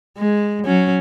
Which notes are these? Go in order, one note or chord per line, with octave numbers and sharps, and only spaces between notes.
G#3
F#3 C#4